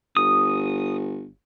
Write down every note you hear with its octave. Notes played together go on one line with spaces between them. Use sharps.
G1 D#6